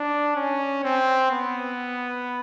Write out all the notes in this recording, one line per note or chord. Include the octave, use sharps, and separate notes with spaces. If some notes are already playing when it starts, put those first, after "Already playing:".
Already playing: D4
C#4
C4
B3